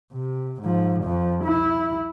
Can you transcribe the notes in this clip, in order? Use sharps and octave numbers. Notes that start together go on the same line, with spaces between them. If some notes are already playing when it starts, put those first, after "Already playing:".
C3
G#2 F3
F2 F3
E4